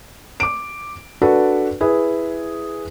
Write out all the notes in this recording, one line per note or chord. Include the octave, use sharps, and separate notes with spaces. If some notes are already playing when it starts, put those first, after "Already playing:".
D6 D7
D4 F#4 A4 B4
E4 G#4 B4